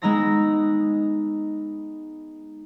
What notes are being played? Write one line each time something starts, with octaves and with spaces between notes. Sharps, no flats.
G#3 B3 D#4 A#5 E6 A#6